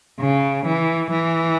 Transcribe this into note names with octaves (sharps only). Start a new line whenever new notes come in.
C#3
E3
E3